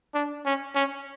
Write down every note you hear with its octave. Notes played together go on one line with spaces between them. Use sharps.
D4
C#4
C#4